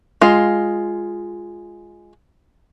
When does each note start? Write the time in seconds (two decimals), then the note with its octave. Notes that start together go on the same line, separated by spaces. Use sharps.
0.21 G#3 F4